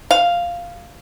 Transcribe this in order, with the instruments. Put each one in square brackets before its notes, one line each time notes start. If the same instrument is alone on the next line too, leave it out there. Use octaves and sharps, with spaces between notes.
[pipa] F5